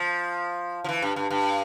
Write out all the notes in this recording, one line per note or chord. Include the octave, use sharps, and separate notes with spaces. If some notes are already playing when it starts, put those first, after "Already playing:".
Already playing: F3
F3
E3
G2
G2
G2